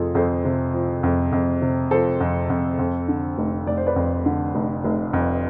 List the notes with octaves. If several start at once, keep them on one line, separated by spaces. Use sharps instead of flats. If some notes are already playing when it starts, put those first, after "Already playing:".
Already playing: F2 C3 F4 G#4 A4
F2 A4 C5
C3
F3
F2
F2
C3
F3 A4 C5
F2
F2
F2
D3
F1
F1 D5
C5
B4 D5
F2
D3
F1
F1
F2